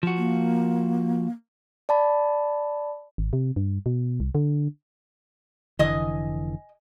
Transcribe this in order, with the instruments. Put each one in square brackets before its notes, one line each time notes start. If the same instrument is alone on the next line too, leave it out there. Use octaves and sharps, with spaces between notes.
[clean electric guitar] F3 F#4
[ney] A#3
[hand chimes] D5 A5 B5
[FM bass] G#1
C3
G2
B2
C2
D3
[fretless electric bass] F1 D3 E3 [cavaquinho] D#5 G#5 D#6